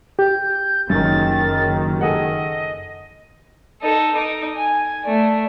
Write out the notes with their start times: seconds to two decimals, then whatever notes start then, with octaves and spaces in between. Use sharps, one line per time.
0.19 G4 G6
0.90 F#1 F#2 D#3 A6
2.01 G#4 A4 D#5 F#5
3.82 D#4 A4
4.15 D#4 D6
4.55 G#5
5.05 A3 D5